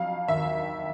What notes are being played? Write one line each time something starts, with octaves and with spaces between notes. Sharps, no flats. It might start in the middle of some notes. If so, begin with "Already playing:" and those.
Already playing: F2 F#3 F5
D#2 E5